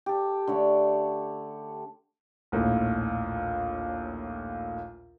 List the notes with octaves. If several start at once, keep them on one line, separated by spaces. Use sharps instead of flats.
G4 A4
D3 A3 C#5
A#1 D#2 A2